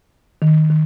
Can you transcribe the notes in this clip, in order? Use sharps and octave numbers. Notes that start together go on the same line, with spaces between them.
D#3
D#3